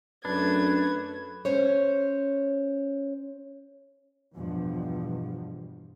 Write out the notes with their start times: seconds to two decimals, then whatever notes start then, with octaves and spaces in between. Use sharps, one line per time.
0.25 F#2 A3 D4 B4 G#6
1.45 C#4 C5 C#5
4.35 E2 G2 B2 F3